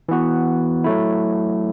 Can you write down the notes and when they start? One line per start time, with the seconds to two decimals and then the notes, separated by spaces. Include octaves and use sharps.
0.09 E3 B3 F#4
0.84 F#3 A3 E4